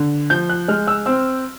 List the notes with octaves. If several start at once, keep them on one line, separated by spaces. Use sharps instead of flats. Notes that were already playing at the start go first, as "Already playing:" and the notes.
Already playing: D3
F3 G6
F#6
G#3 F6
E6
C4 E6